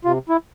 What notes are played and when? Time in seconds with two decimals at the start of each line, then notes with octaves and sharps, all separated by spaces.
0.05 C3 F4
0.29 E4